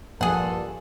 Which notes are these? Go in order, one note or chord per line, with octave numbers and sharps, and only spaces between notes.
A#1 G2 A#2 G#4 A4 F#5